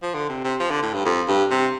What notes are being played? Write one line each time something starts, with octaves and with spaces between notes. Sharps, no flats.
F3
D3
C3
C3
F3
D3
A2
G2
F2
G2
C3